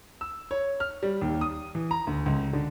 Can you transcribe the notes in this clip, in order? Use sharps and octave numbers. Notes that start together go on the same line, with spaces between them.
E6
C#5
F6
G3
D#2
D#6
E3
A#5
D2
C#2
D3